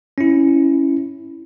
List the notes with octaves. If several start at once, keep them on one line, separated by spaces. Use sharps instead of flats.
C#4 E4